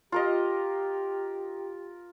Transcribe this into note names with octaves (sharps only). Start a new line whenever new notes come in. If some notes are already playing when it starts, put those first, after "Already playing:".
F4 G4 A#4 D#5